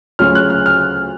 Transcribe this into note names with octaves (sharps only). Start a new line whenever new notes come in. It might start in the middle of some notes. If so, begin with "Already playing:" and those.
D2 C#3 F#3 C#4 F4 F6
F#6
F6
F6